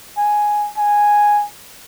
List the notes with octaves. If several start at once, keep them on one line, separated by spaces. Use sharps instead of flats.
G#5
G#5